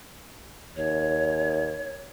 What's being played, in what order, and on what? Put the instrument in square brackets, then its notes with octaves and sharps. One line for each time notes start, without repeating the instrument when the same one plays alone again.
[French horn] D#2 [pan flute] C#5